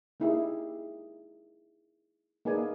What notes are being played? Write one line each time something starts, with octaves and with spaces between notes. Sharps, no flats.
A#3 D#4 E4 G4 G#4
A#3 D#4 G#4 B4 D5 G#5